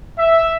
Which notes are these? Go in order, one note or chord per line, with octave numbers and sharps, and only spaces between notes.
E5